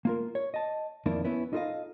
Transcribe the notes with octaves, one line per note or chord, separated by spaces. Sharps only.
A#3 F4 A#4
C#5
D#5 A5
F2 D#3 A#3 D4 E4
B3 C#4 E4
D#4 F4 A4 B4 D#5 F5